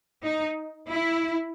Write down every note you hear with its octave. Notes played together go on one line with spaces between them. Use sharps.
D#4
E4